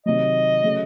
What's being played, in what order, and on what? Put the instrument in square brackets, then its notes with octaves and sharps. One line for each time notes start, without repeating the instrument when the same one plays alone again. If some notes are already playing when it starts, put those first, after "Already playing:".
[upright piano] C3 D#3 F#3 [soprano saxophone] D#5
[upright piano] C#3 F#3 A3